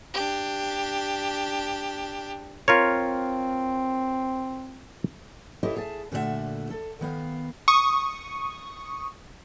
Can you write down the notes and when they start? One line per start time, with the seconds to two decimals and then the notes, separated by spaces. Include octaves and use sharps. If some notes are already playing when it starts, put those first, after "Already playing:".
0.14 D4 G4
2.68 C4 F4 A#4 C#5
5.63 E4 G4 A4 B4 C#5 D#5
5.77 G#4 E5 A5
6.12 A#2 D3 A3 F#4 A4 E5
6.70 A4
7.01 D#3 B3 F5
7.68 C#6 D#6